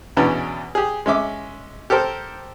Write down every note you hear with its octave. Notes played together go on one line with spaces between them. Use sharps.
E2 B2 E3 C#4 D4
G4 G#4
G#3 C#4 E5 D6
G4 A4 A#4 C5